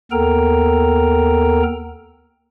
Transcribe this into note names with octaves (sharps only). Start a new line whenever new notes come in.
D#2 B3 A4 A#4 G5 A#5